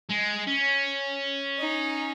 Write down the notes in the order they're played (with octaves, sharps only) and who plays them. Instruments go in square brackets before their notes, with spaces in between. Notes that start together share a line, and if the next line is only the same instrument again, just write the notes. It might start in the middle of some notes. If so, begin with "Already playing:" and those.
[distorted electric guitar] G#3
C#4
[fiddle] D#4